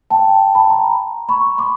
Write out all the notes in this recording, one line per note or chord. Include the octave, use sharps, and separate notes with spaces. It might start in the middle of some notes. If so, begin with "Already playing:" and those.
G5 A5
A5 B5
A#5 C6
B5 C#6
C6 D6